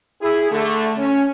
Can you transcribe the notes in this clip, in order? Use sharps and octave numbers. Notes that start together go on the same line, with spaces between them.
E4 G#4
D3 A3
C#4